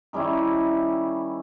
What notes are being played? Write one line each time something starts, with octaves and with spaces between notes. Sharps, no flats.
D#3 G3 C#4 E4